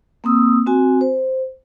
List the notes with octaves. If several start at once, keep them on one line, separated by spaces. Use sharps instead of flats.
A#3 C4 D#6 E6
C4 F#4 G#5
C5